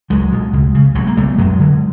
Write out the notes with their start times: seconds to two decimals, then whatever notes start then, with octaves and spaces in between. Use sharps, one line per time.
0.10 C#2 F#3 G#3
0.32 B2
0.53 C#2
0.75 C#3
0.95 C2 F#3 G#3
1.07 A#3
1.17 B2 G3 A3
1.38 F#2 F#3 G#3
1.59 D3